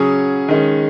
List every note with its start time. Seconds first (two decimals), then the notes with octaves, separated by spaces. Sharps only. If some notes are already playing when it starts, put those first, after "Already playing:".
Already playing: C#3 F#3 C#4 G#4
0.49 D#3 G#3 C#4